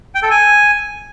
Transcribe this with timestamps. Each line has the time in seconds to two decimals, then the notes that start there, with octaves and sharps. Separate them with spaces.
0.15 G5
0.23 A4
0.31 G#5